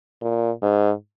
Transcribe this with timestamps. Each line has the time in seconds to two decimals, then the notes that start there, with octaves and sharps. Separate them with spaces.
0.22 A#2
0.62 G#2